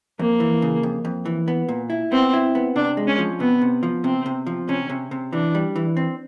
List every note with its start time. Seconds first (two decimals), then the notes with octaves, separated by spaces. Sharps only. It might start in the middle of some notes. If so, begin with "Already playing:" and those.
0.19 F2 A#3
0.40 E3
0.62 C#3
0.83 F2
1.05 F2
1.26 E3
1.48 B3
1.69 A#2
1.90 E4
2.12 B3 C4
2.33 E4
2.55 B3
2.76 C3 D4
2.97 G#3
3.07 C#4
3.18 F3
3.40 C3 B3
3.62 C3
3.83 F3
4.04 C3 C4
4.26 C3
4.47 F3
4.69 C3 C#4
4.90 C3
5.11 C3
5.33 E3 D4
5.55 G3
5.76 E3
5.97 C4